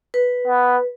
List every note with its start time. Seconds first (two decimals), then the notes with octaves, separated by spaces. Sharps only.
0.14 B4
0.47 B3